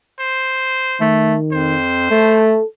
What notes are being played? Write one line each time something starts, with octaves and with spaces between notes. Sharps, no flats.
C5
D#3 A3
F2 C5
A3 A4